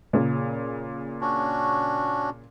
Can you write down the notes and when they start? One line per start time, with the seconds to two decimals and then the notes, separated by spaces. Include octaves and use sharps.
0.13 A#2 C#3
1.21 C#4 D4 F#4